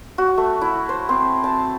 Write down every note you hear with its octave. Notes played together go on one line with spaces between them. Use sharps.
F#4
A3
E4
C5
C4
A5